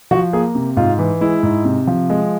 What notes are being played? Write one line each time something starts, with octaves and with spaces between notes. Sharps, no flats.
F3 F#4
A#3 G#4
C3
G#2 F4
E3
G#3 E4
G#2
C3
F3
G#3